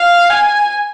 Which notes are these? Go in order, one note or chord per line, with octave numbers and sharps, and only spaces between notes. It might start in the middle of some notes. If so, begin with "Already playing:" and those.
Already playing: F5
G#5